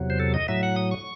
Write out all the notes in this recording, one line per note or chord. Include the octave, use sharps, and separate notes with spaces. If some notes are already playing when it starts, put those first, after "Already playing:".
Already playing: E2 C3 F#3
C5
A4
D#5
A2 F#3 E5
F#5
D#6
C#6